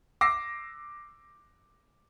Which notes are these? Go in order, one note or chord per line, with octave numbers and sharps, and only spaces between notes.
D6 E6 A#6 C7